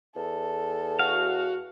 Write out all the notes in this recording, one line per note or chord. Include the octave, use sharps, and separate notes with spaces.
E2 A4
F#4 F5